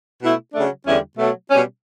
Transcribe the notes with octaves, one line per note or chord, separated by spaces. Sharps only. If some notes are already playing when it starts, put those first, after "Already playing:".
B2 A3 E4
C#3 F#3 A3 D4
E2 D3 G3 C#4 E4
B2 F#3 A3
B2 G3 C#4